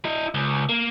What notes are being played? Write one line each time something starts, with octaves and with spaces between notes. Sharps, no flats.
E4 D#5
C#2
A#3